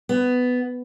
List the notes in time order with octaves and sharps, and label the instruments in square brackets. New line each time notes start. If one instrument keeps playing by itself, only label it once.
[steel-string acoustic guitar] B3